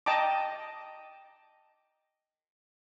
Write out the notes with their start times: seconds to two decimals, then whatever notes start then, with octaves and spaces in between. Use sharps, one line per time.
0.06 D#5 G5 A5 A#5 D6